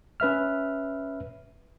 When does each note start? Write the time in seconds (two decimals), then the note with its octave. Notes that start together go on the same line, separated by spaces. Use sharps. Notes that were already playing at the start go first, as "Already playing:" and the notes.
0.20 C#4 B4 E5 F6